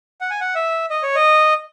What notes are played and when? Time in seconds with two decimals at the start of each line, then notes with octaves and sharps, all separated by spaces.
0.21 F#5
0.31 G#5
0.41 F#5
0.55 E5
0.90 D#5
1.03 C#5
1.15 D#5